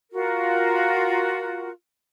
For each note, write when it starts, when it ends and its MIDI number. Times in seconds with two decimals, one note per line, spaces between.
0.12 1.68 65
0.12 1.68 66
0.12 1.68 70